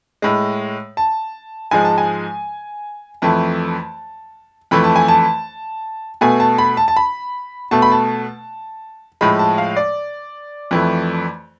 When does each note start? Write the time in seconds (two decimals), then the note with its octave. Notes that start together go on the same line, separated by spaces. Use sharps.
0.22 A2 G#3
0.97 A5
1.71 G#2 F3 G#3 G#5
1.85 A5
1.98 G#5
3.22 F2 E3 A3 A5
4.71 F2 E3 A3 B5
4.84 A5
4.96 G#5
5.08 A5
6.21 B2 A3 G#5
6.40 A5
6.58 B5
6.77 A5
6.88 A5
6.96 B5
7.71 B2 A3 A5
7.82 B5
7.92 A5
9.21 A2 F3 G#3 B5
9.39 A5
9.58 F5
9.76 D5
10.71 F2 E3 A3